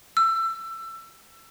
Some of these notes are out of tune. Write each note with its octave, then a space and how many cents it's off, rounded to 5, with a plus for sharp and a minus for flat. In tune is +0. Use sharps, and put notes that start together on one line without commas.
E6 +20